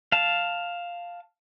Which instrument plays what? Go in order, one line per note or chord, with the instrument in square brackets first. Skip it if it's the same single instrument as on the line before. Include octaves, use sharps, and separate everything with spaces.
[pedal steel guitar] F5 A5